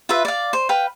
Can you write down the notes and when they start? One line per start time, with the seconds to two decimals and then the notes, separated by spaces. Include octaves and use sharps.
0.09 F4 B4 E5
0.25 D5 F5
0.53 C5
0.69 B4 F5 G5